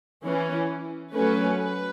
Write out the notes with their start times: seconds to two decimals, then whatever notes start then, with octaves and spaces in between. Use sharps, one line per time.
0.23 E3 C#4
1.13 F#3 A3 C#4 B4
1.59 B4